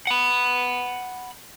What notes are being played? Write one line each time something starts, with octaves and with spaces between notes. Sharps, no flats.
F#5 B5